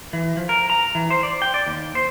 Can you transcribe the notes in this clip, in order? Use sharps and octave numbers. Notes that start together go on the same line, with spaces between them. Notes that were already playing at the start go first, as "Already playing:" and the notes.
E3
F3
A#4
A#5
E3
C5
D5
G5
D5
D#2
C5